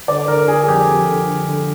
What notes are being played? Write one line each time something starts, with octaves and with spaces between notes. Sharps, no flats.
D3 D5
D3 A#4
D3 G#4
G#4
F2 G4
F2
D3
D3
D3